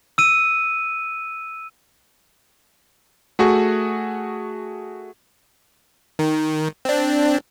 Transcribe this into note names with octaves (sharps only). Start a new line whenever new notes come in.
E6 D#7
A3 F#4 G#4 C#6
D#3
C4 D4